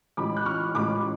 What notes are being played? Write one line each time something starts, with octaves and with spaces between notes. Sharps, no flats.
A1 A2 G#3 B5 D6
F#6
C#6 F6
A1 A2 G#3 B5 D6